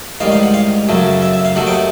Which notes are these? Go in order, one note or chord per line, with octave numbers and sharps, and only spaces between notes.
A1 G#2 D#3 G3 F5
F5
F#5
F5
F#2 C#3 F#3 A3
E5
E5
F5
D#2 D#3 F#3 A3 F#5
G5
F#5